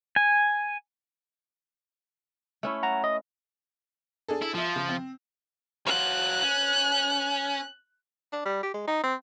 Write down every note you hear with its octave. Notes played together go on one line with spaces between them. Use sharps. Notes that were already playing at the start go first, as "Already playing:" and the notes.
G#5
A3 C#4 E4
F#5 A#5
D#5
D4 G#4 A4
E4
F3 F4 E5
C#3
C4
F#3 F4 F#6
C#4
D4
G3
G4
G#3
D#4
C4